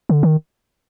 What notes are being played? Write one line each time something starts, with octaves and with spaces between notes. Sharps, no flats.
D3
D#3